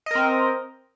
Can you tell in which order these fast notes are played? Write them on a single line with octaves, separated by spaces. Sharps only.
D#5 A#4 C4